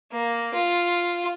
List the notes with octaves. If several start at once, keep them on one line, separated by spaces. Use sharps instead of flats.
A#3
F4